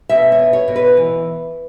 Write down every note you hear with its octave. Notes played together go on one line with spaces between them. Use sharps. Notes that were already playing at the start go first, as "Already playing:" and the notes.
B2 E5
C#5
B3
C#5
B2
B4
E3